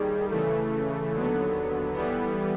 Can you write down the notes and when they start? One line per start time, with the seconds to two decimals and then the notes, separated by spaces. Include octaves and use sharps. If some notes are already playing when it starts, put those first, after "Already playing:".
Already playing: D#2 D#3 G3 G#4
0.30 C#3 E3 A3 A4
1.12 D#2 D3 F#3 B3
1.94 E3 G3 B3